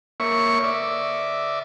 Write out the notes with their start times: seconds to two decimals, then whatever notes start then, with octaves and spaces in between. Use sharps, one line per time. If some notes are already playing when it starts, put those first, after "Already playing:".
0.20 A#3 C#5 E5 C#6
0.64 D5 E5